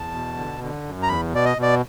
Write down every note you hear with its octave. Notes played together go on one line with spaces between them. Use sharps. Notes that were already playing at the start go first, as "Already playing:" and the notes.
Already playing: E2 A5
B2
D3
D3
F#2
A#5
E2 B5
B2 D5
D#5
B2 D5